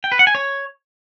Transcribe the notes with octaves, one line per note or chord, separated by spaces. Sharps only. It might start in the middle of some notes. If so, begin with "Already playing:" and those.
G5
B4
F#5
G#5
C#5